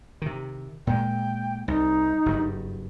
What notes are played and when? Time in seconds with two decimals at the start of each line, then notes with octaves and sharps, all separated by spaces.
0.22 C3 D#3
0.87 A#2 G#3 G5
1.68 C2 D#4
2.26 F#1 G2